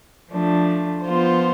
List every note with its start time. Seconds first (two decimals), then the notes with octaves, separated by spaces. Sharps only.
0.31 F3 A3 D4
1.05 F3 B3 F4 C5